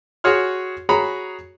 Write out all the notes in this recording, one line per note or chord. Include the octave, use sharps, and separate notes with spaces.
F#4 G#4 C#5 C6 F6
F#4 G#4 C#5 A#5 B5